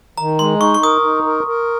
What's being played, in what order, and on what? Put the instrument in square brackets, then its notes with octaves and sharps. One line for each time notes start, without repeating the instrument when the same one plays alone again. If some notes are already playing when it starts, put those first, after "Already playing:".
[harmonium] D#3 [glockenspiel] A#5
[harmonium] G#3 [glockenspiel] C6
[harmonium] D#4 [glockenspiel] C#6
[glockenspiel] C#6
[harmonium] A#4 [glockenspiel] D#6
[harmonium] D#4
A#4
A#4